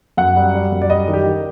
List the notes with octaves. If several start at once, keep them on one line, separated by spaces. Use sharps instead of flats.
F#2 F#5
G3
G3
F#2
D5
G3 D#5
D#3
G4
D#3